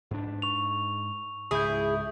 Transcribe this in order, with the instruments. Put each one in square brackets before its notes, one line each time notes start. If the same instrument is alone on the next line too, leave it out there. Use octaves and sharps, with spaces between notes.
[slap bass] G#2 D4
[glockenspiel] C#6 F7
[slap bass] C#2 G#2 C#3 [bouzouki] E4 G#4 [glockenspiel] D#6 G6